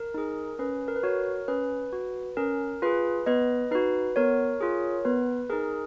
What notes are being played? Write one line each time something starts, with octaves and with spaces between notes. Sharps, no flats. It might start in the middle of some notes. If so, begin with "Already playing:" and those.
Already playing: A#4
D#4 G#4
C#4 B4
A#4
B4
F#4 A#4 C#5
C#4 B4
F#4
C#4 A#4
F4 G#4 B4
B3 B4 D#5
D#4 F#4 B4
B3 A#4 C#5
F4 G#4
B3 B4
D#4 G#4 A#4